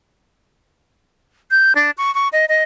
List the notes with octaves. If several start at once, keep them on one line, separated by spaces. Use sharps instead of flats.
G6
D4
C#6
C#6
D#5
D#5